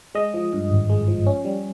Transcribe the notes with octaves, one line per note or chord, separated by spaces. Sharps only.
G#3 D#5
F3
G2
G#1
G#3
F3
C#4
G3